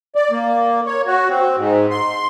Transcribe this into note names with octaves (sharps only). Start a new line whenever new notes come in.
D5
A#3
C#5
F#4
C4
G#2
C6